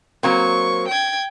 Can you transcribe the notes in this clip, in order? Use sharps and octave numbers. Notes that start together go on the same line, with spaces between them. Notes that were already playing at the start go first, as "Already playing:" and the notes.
F#3 A#3 C4 C#6
G5 G#6